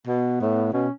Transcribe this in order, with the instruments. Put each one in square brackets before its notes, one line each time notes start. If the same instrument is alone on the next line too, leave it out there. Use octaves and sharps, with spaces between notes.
[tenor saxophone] B2 [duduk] B3
[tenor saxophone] A2
[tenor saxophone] B2 [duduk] C#4